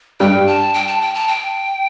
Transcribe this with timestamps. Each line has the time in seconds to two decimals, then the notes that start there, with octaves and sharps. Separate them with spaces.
0.20 G2 G3 G5
0.47 A5
0.74 G5
0.87 A5
1.01 G5
1.14 A5
1.28 G5